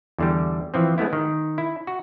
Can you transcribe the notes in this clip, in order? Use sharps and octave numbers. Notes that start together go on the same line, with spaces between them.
E2 D3 G3
E3 F3 C4
G#3 A3 B3 E4
D#3
E4
F#4